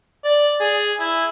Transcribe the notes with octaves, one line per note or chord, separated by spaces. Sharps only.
D5
G#4
E4